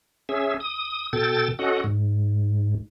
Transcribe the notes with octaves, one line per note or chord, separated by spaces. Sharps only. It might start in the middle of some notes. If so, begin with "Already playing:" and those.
C#4 G#4 E5
D#6
B2 A4 G5 A6
C#4 F#4 A4 D#5 F#5
G#2